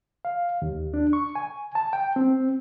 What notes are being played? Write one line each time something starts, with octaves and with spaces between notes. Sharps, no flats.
F5
D#2
D4
C#6
G#5
A5
G5
C4